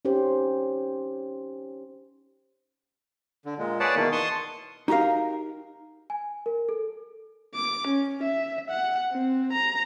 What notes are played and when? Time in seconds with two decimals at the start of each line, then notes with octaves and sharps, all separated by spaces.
0.05 C#4 D#4 G4 C5
3.45 D3
3.58 A#2 G#3
3.80 G#4 B4 C#5 D5 F#5 A5
3.95 B2 D#3 E3 A#3
4.12 A5 C6 C#6 D#6
4.88 D#4 F#4 G4 A#4 F5
6.10 G#5
6.46 A#4
6.69 A4
7.55 D6
7.88 C#4
8.23 E5
8.70 F#5
9.13 C4
9.53 A#5